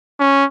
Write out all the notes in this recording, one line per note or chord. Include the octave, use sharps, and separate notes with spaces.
C#4